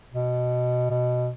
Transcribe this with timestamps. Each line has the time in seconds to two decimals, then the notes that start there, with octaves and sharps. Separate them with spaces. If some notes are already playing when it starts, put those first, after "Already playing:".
0.13 B2
0.90 B2